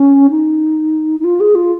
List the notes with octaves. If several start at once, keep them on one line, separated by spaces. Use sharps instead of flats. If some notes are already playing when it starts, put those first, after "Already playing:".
Already playing: C#4
D#4
D#4
F4
G#4
F4